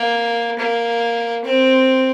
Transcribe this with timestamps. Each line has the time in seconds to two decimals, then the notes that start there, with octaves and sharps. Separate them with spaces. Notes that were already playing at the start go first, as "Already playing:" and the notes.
Already playing: A#3
0.59 A#3
1.45 C4